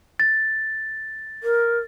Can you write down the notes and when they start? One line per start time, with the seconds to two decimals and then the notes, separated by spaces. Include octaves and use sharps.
0.20 A6
1.43 A#4